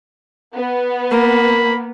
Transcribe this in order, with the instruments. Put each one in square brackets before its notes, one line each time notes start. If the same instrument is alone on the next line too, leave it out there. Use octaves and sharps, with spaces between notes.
[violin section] B3
[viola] A#3 [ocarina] A#4 [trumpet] B5